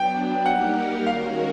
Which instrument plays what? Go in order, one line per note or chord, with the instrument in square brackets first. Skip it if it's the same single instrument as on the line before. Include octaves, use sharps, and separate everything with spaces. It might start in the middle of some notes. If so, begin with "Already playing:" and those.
Already playing: [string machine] F#3 B3 D4 [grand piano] G5
[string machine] G3 A#3 D#4 G4 A#4 [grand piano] F#5
[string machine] D#3 G#3 C#4 F#4 A#4 [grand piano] F5